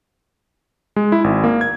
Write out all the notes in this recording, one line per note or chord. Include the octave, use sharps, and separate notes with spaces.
G#3
E4
G#1
A#3
G#6